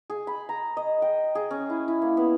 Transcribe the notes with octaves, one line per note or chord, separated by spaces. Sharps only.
G#4
B5
A#5
D#5
G5
G#4
C#4
E4
E4
A#3
B3